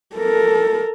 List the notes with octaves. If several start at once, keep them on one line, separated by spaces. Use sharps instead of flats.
A4 A#4